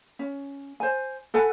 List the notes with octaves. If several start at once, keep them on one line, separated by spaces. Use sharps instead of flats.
C#4
C5 G#5
A4 B4 F#5 G#5